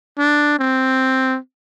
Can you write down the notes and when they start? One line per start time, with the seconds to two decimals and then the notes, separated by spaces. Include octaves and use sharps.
0.18 D4
0.59 C4